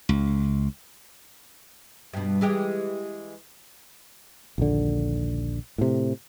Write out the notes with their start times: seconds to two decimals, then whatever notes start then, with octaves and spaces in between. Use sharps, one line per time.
0.09 C#2
2.13 G2 B2
2.41 E3 G#3 G4
4.58 A#1 D#2 D3
5.78 A2 C3